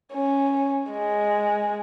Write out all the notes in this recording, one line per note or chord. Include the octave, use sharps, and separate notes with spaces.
C#4
G#3